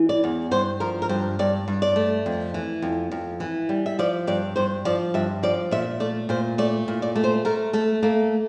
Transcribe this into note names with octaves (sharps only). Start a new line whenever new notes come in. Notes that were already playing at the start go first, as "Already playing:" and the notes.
Already playing: E3
D5
E2
G2 C5
F3 A#4
A#4
G2 C5
G2 D5
G2
D5
A3
F2
E3
F2
F2
E3
G3
E5
F3 D5
G2 D5
G2 C5
F3 D5
G2 E5
F3 D5
A#2 E5
A3 D5
A#2 C5
A3 D5
A#2
D5
A3
C5
A3 A#4
A3 A4
A3 A#3